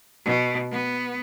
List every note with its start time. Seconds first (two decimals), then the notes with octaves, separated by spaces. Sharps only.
0.25 B2
0.71 B3